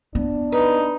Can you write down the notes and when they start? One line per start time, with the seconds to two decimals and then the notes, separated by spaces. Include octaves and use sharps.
0.15 B3 D4
0.52 D#4 B4